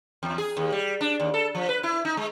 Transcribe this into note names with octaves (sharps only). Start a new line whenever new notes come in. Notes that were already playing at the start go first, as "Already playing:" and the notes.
E2
G#4
D#2
G3
D4
D#2
A4
F3
B4
E4
D#4
G#3